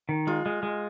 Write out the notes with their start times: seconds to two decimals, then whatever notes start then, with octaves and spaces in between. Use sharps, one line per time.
0.09 D#3
0.27 G#3 F4
0.46 G#3
0.63 G#3